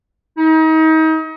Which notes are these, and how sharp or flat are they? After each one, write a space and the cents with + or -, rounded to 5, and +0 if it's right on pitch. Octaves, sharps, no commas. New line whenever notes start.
D#4 +35